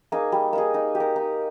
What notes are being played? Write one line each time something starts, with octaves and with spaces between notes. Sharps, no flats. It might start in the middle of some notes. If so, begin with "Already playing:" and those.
A#3 D#4 G#4
G3
A#3 D#4 G#4
D#4
G4
A#4
D#4